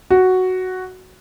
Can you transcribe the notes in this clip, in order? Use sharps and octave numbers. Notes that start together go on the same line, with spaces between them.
F#4